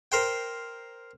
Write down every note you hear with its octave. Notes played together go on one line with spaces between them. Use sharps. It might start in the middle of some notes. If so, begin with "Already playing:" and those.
A#4 C5 G5